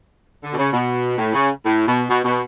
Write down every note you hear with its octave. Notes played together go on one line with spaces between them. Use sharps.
D3
B2
C#3
B2
A2
C#3
A2
B2
B2
B2